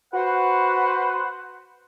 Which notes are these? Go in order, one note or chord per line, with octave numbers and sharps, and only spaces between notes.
F#4 B4 C5 F#5